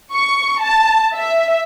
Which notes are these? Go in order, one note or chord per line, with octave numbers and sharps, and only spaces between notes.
C#6
A5
E5